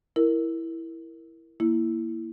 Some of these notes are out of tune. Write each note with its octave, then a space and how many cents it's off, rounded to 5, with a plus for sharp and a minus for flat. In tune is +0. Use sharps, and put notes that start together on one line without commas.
E4 +0 A#4 +0
A#3 +0 E4 +0